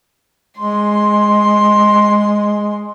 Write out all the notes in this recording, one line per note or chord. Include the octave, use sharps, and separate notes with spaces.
G#3 C6